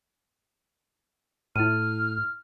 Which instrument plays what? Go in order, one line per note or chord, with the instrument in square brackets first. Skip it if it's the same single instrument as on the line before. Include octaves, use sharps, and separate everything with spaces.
[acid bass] A2 [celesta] E4 D#7 [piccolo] F6